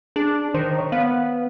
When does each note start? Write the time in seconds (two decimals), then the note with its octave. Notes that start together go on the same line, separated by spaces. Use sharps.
0.16 D4 G#4
0.54 D#3 C5
0.79 C#5
0.92 B3 F5